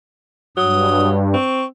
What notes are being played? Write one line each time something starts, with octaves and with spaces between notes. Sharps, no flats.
G2 F#3 D#6
C4 C#6